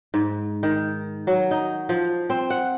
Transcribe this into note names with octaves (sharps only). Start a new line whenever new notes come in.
G#2
D#3
F#3
D#4
F3
C4
F#5